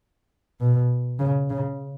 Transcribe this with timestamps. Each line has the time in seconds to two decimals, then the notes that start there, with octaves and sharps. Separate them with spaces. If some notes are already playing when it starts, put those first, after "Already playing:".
0.60 B2
1.19 C#3
1.50 C#3